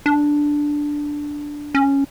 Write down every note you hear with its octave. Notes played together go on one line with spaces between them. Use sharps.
D4
C#4